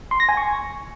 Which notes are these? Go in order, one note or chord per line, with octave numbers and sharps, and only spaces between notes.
C6
A#6
G#5
C#6